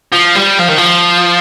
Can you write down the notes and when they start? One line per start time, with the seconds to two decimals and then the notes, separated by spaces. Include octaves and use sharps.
0.13 F3
0.36 G3
0.60 F3
0.69 D#3
0.78 F3